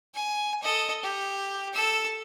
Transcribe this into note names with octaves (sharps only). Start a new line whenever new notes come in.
G#5
A4 D#5
G4
A4 E6